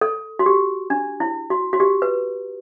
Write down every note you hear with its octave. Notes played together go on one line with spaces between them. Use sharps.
A4
F#4
G4
D4
E4
F#4
F#4
G4
B4